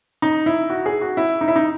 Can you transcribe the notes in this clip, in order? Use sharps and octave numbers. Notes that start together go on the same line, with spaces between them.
D#4
E4
F#4
G#4
F#4
E4
D#4
E4
D#4